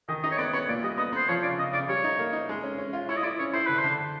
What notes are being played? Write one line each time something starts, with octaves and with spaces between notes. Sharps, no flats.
D#3 D#5
D#4 D#5
C#5
B3 D5
B3 C#5
A#2 D5
G3 D#5
B3 D#5
B3 C5
F3 C#5
C#3 D5
C#3 D#5
C#3 D5
G3 C#5
D#4
A#3
D#4
G#3
C#4
C#4
F4
E4 C#5
D#5
E4 D5
C#4 C#5
E4 C5
D3 B4
C5
D3